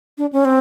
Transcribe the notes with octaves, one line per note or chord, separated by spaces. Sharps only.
D4
C#4
C4